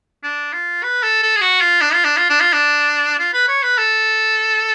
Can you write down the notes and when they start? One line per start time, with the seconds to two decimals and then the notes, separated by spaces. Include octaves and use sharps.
0.23 D4
0.53 F4
0.83 B4
1.03 A4
1.22 A4
1.36 G#4
1.41 F#4
1.61 F4
1.81 D4
1.93 F4
2.04 D4
2.17 F4
2.30 D4
2.40 F4
2.53 D4
3.19 F4
3.33 B4
3.48 C#5
3.63 B4
3.78 A4